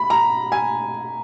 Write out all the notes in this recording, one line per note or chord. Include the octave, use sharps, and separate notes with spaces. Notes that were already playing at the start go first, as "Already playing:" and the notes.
Already playing: B5
A#5
G#5